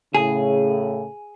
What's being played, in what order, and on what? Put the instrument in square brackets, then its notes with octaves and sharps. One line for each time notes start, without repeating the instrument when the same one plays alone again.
[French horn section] A2 C#3 [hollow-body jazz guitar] G#4